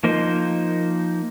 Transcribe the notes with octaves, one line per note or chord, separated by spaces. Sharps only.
F3 A#3 D#4 C5